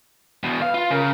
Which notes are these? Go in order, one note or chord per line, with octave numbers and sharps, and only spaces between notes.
E2 B2
B4 F5
F4
C#3 A#4